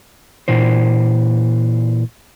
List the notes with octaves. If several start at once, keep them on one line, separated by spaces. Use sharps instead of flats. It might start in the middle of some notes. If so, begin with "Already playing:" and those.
A#2 E3 C5